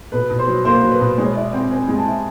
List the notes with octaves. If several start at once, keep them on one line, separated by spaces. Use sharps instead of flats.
B2 B4
B2
C5
F#3
A#3 C5
F#3
B4
B2
G#3 C#5
E4 D5
C4 G5
C4 G#5
G#3
G#5
A5
E4